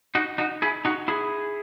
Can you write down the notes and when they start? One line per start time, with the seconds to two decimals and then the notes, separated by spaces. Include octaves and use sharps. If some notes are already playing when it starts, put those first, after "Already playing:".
0.15 D#4 F#4
0.38 D#4 F#4
0.62 E4 G#4
0.85 D#4 F#4
1.08 E4 G#4